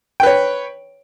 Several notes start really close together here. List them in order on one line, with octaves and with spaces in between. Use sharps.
G5 B4 C#5